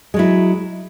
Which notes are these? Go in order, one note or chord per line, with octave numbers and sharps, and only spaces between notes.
F#3 G#3 E4